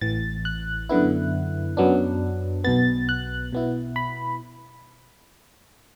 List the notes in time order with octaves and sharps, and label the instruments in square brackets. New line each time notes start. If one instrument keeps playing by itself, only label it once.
[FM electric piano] A1 A2 E3 A6
F#6
F#2 D3 B3 E4
F#2 F#3 B3 D4
B1 B2 B3 A6
F#6
B2 B3 E4
B5